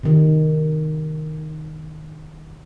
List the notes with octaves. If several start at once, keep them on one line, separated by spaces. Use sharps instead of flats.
C3 D#3